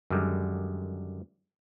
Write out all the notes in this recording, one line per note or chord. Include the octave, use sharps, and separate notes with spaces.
F#2 D3 D#3 G3 G#3